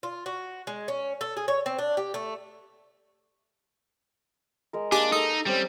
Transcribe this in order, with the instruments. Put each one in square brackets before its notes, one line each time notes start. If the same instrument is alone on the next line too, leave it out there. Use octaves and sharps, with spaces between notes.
[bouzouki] F4
F#4
G#3
C#4
A4
G#4
C#5
C4
D4
G4
A3
[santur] G#3 A#4
[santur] G#3 A#3 G#4 [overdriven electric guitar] D4 [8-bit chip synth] G4 G#5 D6
[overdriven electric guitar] D#4 [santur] A4 [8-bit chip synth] D#6
[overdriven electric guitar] G3 [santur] C4 C#4 G4